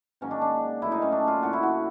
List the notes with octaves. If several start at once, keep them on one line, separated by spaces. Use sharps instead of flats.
G#2 D#3 F#3 A#3 C#4
D4
D4
A2 F#3 A#3 E4
D#4
C#4
D4
F4
F#2 D3 F#3 A#3 F#4
E4
F#4